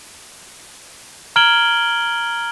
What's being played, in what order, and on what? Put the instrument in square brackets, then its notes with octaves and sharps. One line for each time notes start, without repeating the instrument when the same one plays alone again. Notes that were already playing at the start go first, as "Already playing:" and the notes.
[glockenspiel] A#5 F6 G#6 D7 F#7 G7